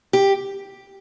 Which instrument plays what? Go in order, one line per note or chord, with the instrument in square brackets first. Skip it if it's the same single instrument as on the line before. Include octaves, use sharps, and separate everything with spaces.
[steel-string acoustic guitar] G4